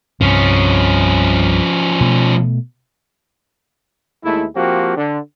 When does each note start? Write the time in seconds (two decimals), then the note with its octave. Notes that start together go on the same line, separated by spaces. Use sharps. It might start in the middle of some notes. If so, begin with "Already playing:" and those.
0.21 C2 G2 F3 C4 C#4
2.01 B2 A3
4.25 D#2 G#3 A3 E4
4.56 F3 A#3 C4 F#4 G4
4.97 D3